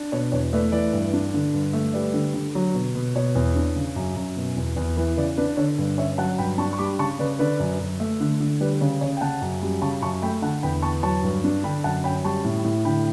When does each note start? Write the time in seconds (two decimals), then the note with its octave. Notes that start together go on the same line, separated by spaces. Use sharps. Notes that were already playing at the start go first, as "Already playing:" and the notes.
Already playing: D4
0.12 B2 C#5
0.32 E2 C#5
0.53 A3 B4 D5
0.72 E3 B4 D5
0.93 G2
1.14 D4
1.34 D3
1.54 G2
1.73 A3
1.94 G3 B4 D5
2.14 D3
2.34 D3
2.55 F#3
2.74 B2
2.95 B2
3.15 B2 C#5
3.35 E2
3.55 D4
3.76 C#3
3.96 F#2
4.16 F#2
4.37 B2
4.57 E2
4.76 E2
4.97 E3 B4
5.17 C#3 B4 D5
5.37 D4 B4 D5
5.57 D3 C#5
5.78 G2
5.98 C#4 C#5 E5
6.18 F#3 F#5 A5
6.38 G2 G5 B5
6.58 D4 A5 C#6
6.73 C#6
6.79 G3 B5 D6
6.99 C#3 A5 C#6
7.19 C#3 B4 D5
7.39 D3 B4 D5
7.59 F#2
7.80 F#2
8.00 A3
8.20 D3
8.40 D3
8.60 G3 B4 D5
8.81 C#3 C#5
9.01 C#3 C#5
9.17 G5
9.21 C#3 F#5 A5
9.42 F#2
9.62 G3
9.81 C#3 A5 C#6
10.02 F#2 A5 C#6
10.22 A3 G5 B5
10.42 D3 F#5 A5
10.63 E2 G5 B5
10.82 B3 A5 C#6
11.03 F#3 A5 C#6
11.23 G2
11.44 D4
11.64 D3 G5 B5
11.84 F#2 F#5 A5
12.04 C#4 G5 B5
12.24 G3 A5 C#6
12.44 A2
12.64 A2
12.85 D3 G5 B5